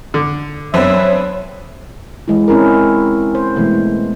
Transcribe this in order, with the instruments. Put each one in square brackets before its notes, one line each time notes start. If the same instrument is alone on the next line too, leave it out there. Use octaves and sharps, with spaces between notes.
[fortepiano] D3
[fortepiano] F#2 [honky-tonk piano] B3 C4 D4 [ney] C#5 [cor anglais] E5
[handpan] E3 G#3 E4
C4 C#4 E4 G#4 A#4
C5
B2 E3 G#3 A3 B3